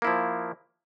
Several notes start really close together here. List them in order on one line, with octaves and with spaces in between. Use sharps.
A#3 E4 F3